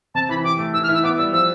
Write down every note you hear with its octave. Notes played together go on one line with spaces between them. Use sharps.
C3 A5
E3 B5
G4 D6
A3
E3 E6
F6
E4 E6
B3 D6
G3 E6
F3 E6